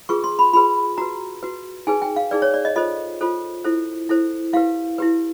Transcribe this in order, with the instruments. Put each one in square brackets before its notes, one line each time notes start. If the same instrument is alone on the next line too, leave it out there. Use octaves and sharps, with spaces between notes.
[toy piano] F4 G#4 B4 C#6
C6
B5
F4 G#4 B4 B5
F#4 B4 A#5
F#4 B4
D#4 G#4 B4 G#5
G5
F5
D#4 G#4 B4 D5
C#5
D5
D#5
F4 A4 C5 D#5
F4 A4 C5
E4 A4 C5
E4 A4 C5
E4 G4 B4 F5
E4 G4 B4